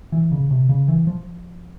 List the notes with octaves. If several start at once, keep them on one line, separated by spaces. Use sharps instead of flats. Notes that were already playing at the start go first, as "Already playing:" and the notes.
E3
C#3
C3
C#3
E3
F3